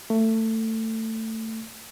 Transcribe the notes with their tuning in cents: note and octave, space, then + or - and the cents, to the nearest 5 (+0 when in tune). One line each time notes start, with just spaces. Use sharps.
A3 +20